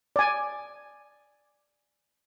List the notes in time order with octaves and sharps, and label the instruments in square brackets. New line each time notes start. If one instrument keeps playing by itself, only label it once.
[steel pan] D5 G#5